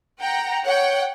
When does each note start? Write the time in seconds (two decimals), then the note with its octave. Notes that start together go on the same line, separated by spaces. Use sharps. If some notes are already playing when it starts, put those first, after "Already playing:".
0.20 F#5 G5 A#5
0.65 C#5 F#5 G5